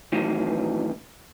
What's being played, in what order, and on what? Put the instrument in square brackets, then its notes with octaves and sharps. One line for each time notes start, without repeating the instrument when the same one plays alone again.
[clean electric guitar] A2 D#3 E3 F#3 B3